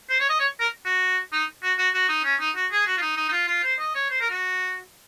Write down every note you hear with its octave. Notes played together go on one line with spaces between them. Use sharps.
C5
C#5
D#5
C#5
A#4
F#4
D#4
F#4
F#4
F#4
D#4
C#4
D#4
F#4
G#4
F#4
F4
D#4
D#4
D#4
F4
F4
C5
D#5
C#5
C5
A#4
F#4